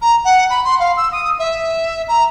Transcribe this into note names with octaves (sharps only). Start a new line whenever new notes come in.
A#5
F#5
B5
C6
F5
E6
D#6
E5
A#5